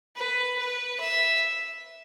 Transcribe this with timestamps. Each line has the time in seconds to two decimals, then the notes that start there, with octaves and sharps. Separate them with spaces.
0.17 B4
0.58 B4
1.00 E5